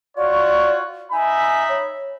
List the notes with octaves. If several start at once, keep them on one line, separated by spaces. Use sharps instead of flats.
F4 F#4 C#5 D5
D#4 E5 G#5 B5
C#5